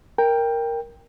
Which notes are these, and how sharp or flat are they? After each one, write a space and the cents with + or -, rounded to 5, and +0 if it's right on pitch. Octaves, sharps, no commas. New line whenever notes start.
A#4 +0 G5 +15